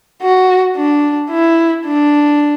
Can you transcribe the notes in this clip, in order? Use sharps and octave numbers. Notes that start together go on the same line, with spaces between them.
F#4
D4
E4
D4